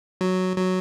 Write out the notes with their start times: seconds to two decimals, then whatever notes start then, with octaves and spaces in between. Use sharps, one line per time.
0.21 F#3
0.57 F#3